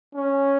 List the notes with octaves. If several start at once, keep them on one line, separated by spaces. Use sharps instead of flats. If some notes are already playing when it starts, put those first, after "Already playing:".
C#4